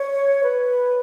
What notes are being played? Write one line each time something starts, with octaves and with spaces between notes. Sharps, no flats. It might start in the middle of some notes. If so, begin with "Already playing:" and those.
Already playing: C#5
B4